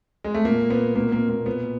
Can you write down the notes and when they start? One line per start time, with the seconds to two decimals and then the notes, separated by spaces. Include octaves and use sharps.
0.24 G#3
0.34 A3
0.45 A#2 A#3
0.70 A#2 B3
0.95 B2 A#3
1.12 A#3
1.21 B2
1.29 A#3
1.46 A#2 B3